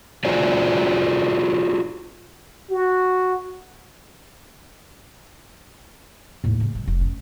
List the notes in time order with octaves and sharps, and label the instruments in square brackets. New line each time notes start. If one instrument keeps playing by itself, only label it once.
[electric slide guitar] F4 F#4 G#4 C5 D5
[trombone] F#4
[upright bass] D#2 A2
C#3
G3
F1
C#4